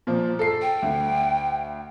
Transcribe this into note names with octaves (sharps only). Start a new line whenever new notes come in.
A#2 F3
A4 C7
G5
D2